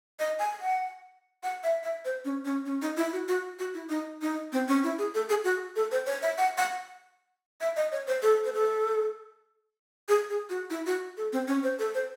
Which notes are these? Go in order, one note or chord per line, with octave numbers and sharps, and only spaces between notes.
D#5
G#5
F#5
F#5
E5
E5
C5
C#4
C#4
C#4
D#4
E4
F#4
F#4
F#4
E4
D#4
D#4
C4
C#4
E4
G#4
A4
G#4
F#4
A4
C5
C#5
E5
F#5
F#5
E5
D#5
C#5
C5
A4
C5
A4
G#4
G#4
F#4
E4
F#4
A4
C4
C#4
C5
A4
C5